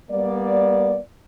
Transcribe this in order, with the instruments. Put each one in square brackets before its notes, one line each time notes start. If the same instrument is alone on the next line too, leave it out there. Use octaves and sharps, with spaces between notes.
[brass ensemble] G3 A#3 B3 D5